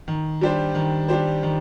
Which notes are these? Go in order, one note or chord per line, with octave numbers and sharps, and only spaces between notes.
D#3
G3 D4 G4 C5
D#3
G3 D4 G4 C5
D#3